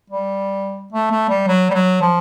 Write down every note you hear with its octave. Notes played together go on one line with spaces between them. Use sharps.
G3
A3
A3
G3
F#3
G3
F#3
F3